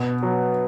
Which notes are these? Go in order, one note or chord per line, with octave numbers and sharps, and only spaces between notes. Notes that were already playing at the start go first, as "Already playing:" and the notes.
Already playing: B2
F#3